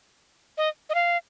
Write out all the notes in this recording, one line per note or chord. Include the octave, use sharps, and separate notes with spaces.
D#5
D#5
F5